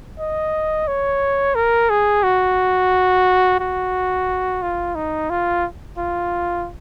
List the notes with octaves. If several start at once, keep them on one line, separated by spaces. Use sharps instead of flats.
D#5
C#5
A#4
G#4
F#4
F#4
F4
D#4
F4
F4